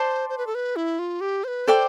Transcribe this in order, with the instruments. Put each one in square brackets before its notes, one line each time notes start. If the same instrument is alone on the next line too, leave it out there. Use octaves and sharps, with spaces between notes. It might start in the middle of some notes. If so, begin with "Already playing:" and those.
Already playing: [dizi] C5 [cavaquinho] D5 A5 C6
[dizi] C5
B4
A4
B4
E4
F4
G4
C5
B4
[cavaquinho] A4 D5 G5 D6 [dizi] C5